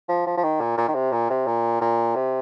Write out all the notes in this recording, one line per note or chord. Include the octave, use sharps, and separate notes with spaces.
F3
F3
F3
D#3
A#2
A#2
D#3
C3
A#2
C3
A#2
A#2
C3